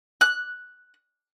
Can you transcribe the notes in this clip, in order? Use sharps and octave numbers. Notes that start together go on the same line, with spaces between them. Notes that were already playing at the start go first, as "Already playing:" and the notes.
F#6